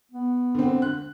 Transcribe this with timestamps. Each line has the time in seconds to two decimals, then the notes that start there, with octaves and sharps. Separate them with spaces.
0.12 B3
0.55 D3 C4
0.82 F#6